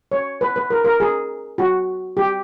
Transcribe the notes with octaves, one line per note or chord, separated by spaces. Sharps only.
C#5
B4
B4
A#4
A#4
G#4
F#4
G4